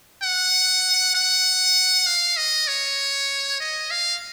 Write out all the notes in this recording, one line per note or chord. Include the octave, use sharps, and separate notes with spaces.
F#5
F#5
F5
D#5
C#5
D#5
F5